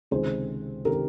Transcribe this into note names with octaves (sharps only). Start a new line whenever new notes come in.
C#2 C3 D#3 G#4 C5
C3 D#3 G4 A#4